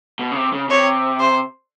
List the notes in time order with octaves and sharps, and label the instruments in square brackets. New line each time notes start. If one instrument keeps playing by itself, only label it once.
[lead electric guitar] B2
C#3
C3
C#3
[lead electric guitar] C3 [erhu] C#5
[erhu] C5